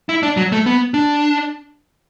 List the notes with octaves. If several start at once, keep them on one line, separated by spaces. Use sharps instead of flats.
E4
D4
F#3
A3
B3
D4